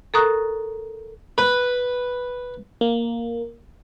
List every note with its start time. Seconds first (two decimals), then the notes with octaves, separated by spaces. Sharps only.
0.14 A4 A#4 A#5 C#6 D#6 F#6
1.38 B4
2.81 A#3